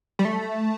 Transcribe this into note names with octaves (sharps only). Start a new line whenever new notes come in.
G3
A3